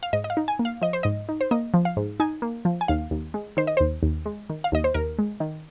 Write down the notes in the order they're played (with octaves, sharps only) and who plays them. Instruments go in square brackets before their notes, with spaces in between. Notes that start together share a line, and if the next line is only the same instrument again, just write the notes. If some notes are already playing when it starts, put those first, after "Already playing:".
[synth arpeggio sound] F5
G#2 D#5
D#5
F5
D#4
G#5
A#3
F5
F3 D#5
C5
G#2 D#5
D#4
C5
A#3 D#5
F3
F5
G#2
D#4 G#5
A#3
F3
G#5
D#2 F5
D#2
G#3
D#3 C5
D#5
D#2 C5
D#2
G#3
D#3
F5
D#2 D#5
C5
D#2 A#4
G#3
D#3